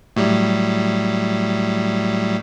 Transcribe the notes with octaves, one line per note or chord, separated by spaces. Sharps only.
A2 F#3 G3